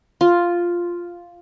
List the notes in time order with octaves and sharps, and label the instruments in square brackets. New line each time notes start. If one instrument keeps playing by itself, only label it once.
[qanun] F4